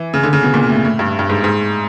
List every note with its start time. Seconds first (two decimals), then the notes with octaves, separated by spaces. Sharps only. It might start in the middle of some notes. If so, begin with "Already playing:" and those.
Already playing: E3
0.14 C#3
0.23 D3
0.33 C#3
0.43 B2
0.54 A#2
0.69 A2
0.84 A2
0.99 G2
1.19 G2
1.29 G#2
1.44 G#2